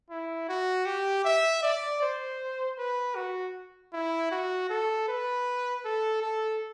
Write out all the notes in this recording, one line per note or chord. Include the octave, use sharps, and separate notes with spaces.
E4
F#4
G4
E5
D5
C5
B4
F#4
E4
F#4
A4
B4
A4
A4